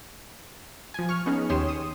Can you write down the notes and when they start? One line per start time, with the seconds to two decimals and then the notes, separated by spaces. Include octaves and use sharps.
0.94 F3 G#5
1.09 C#6 F6
1.26 B3 C#4 D#4 G#4
1.49 D#2 G4 C#5 C6 D#6 E7
1.69 D#6